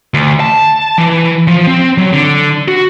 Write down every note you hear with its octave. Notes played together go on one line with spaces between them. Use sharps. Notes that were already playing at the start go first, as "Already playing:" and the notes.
D2
A5
E3
F3
C4
F#3
D3
F#4